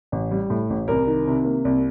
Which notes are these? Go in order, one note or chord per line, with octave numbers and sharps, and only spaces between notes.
A1
G3
A2
A1
C2 A#4
D#3
C3
A#3
C2